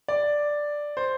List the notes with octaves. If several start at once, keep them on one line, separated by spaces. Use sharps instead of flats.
D5
C5